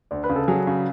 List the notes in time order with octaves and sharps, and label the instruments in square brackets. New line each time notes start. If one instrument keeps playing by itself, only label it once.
[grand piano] D2 [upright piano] D5
[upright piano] B4
[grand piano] C#3
[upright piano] A4
[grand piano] F#3 [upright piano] G#4
[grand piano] C#3